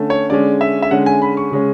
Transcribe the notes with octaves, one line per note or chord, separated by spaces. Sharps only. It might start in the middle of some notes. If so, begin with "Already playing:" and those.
Already playing: D3 A3 C#4
C#5
D3 G#3 C#4 D5
E5
E5
D3 G#3 C#4 F#5
G#5
B5
C#6
C#3 G#3 C#4